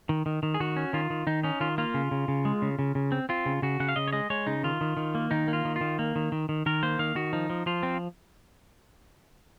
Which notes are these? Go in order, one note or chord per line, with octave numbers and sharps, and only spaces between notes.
D#3
D#3
D#3
G#4
D#3 F#4
C#4
D#3 F4
D#3
D#3 D#4
C#4 D#4
D#3 F4
A#3 F4
C#3
C#3
C#3
G#3
C#3
C#3
C#3
C4
C4 F4
C#3
C#3 F#4
C#3 F#5
F5
C#3 D#5
C#5
G#3 D#5
G#3 C#5
C#3 D#4
D#3 F4
D#3
D#3
A#3
D#3 D#4
A#3
F4
D#3
D#3 F4
A#3
D#3
D#3
D#3
D#3 A#4
A#3 C5
D#3 F5
D#3 F#4
F3 D#4
F3
F3 F4
C4